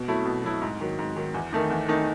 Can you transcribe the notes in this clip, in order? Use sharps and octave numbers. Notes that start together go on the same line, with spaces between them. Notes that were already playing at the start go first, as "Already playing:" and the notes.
Already playing: B2
F#3 A3 E4
B2
F#3 A3 E4
G#2
D#3 F#3
G#2
D#3 F#3
E2
D#3 A3 D#4
E2
D#3 A3 D#4